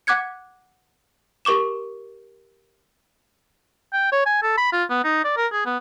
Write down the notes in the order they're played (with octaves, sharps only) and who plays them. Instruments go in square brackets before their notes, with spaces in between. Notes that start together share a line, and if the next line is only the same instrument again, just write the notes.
[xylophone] F#5 D6 F#6 G#6 C#7
G4 A#4 C#6 D6 E7
[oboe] G5
C#5
G#5
A4
B5
F4
B3
D#4
D5
A#4
G#4
B3